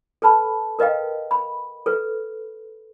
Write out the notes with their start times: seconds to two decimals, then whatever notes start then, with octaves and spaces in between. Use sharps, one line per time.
0.22 A4 B4 A5 B5
0.79 A#4 B4 D#5 F5 G5
1.31 B5
1.86 A4 B4